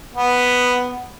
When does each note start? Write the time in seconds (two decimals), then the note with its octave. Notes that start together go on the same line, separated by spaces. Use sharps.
0.15 B3